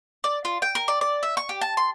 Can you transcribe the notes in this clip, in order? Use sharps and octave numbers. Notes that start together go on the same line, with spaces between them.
D5
F4
G5
A#4
D5
D5
E5
C#6
G4
A5
C6